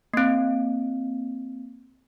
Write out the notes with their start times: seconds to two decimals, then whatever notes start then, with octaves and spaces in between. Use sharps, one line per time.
0.14 A#3 C4